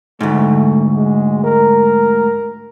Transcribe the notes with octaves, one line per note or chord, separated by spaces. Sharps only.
D2 G#2 A3
G#3
A#4